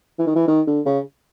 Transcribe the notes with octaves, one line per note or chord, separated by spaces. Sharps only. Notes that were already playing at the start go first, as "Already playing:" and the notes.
E3
D#3
E3
D#3
D3
C#3